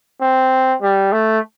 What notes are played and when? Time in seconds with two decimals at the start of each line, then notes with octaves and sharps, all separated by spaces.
0.21 C4
0.82 G3
1.12 A3